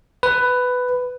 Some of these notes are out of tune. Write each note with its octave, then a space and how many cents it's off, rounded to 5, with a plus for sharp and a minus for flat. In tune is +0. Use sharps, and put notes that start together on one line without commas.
B4 +10